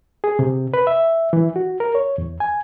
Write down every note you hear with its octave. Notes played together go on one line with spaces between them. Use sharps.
G#4
C3
B4
E5
E3
F#4
A#4
C#5
E2
G#5